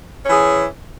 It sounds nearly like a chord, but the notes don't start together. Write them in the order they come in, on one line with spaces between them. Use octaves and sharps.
C#4 E3 G#4